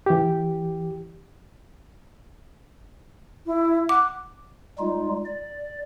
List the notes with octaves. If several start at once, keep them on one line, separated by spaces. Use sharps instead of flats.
E3 G4
E4
F#5 D6
G3 G#3 D#4 F4
D5